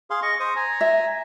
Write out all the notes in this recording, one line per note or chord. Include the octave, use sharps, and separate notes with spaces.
G#4 F5 C6
D#5 C#6
C5 D#6
G#5 A#5
E5